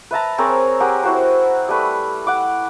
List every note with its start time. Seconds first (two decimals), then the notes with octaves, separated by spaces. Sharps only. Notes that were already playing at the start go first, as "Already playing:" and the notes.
0.11 B4 E5 A5 A#5
0.38 C4 G#4 A#4 C#5
0.80 G4 G#4 A#4 F#5
1.03 E4 F#4 C5
1.69 G3 A3 B4
2.27 F#5 D6